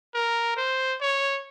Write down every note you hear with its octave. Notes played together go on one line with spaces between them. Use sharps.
A#4
C5
C#5